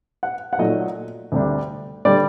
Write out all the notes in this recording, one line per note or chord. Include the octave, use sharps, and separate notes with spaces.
F#5
F#5
A#2 F#3 A3 D#4 D#5
D2 C3 G3 D4
D3 G3 D5